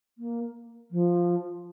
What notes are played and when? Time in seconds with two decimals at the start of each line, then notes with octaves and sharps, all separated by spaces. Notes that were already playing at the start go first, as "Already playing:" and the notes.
0.18 A#3
0.91 F3